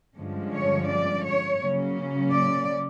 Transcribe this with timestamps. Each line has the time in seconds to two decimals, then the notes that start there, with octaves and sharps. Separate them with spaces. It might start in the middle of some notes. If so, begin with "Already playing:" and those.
0.17 G2 D3 F3 G#3 C#4
0.52 C#5
0.88 D5
1.24 C#5
1.59 C#3 F#3 A#3 C#4
2.30 D5